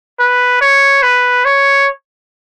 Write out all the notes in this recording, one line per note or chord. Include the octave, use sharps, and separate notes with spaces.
B4
C#5
B4
C#5